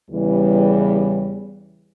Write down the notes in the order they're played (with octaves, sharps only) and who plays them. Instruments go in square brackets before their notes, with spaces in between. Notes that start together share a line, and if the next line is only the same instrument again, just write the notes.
[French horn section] E2 C#3 E3 G3